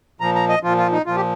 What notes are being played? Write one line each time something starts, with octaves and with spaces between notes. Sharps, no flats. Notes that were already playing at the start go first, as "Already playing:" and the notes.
A#2 F3 A#5
A#5
D#5
A#2 F3 F4
F4
D#4
A#2 F3 F4
G4